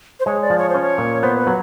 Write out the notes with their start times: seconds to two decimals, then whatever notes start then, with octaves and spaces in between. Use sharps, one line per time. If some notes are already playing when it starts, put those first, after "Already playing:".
0.20 C5
0.26 G#3 C#5
0.42 D5
0.50 F3
0.58 C#5
0.69 C#4 C5
0.81 C#5
0.98 A#2
1.22 B3 C5
1.39 B4
1.47 F#3